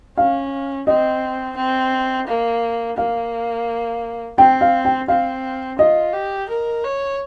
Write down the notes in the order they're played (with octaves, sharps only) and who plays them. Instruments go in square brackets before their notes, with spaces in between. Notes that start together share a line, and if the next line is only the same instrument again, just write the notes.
[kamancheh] C#4 [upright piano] F5
[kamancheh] C4 [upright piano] D#5
[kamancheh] C4
A#3
[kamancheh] A#3 [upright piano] F5
[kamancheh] C4 [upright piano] G5
[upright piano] F5
G5
[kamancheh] C4 [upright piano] F5
[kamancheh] F4 [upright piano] D#5
[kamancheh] G4
A#4
C#5